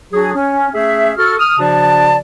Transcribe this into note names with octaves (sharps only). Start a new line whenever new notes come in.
F#3 D4 F#4 G#4
C#4
A3 C#4 G#4 E5
F#4 A4 F6
D#6 F6
C#3 F3 D4 F#4 D5 A5